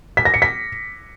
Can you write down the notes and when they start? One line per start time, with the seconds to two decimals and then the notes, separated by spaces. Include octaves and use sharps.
0.17 B6
0.25 A#6
0.34 C#7
0.42 B6